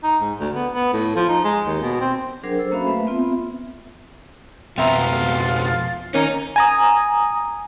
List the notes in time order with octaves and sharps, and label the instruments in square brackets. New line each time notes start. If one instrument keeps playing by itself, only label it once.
[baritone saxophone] D#4
G#2
D2
B3
B3
A2
F3
D#4
G#3
D#2
B2
C4
[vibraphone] F#3 D4 G#4 A#4 C5
A4 C5 E6
A#3 C#4 F#4 E5 F5 B5
A3 B4 E5
B3 C4 F4 E5
[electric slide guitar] F2 B2 B3 [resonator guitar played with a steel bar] C4 E5 A#5 [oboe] F4
[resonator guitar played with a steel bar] D#3 [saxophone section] A#3 C#4 [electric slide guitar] D#4
[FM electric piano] G#5 A#5 D#6